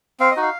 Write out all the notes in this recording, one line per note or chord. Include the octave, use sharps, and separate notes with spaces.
C4 F5
D#5
D#4 F#4
F5